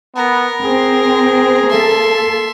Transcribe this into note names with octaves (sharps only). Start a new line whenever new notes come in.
B3 A#4
C4 G#4
A#3 A4 E5 C6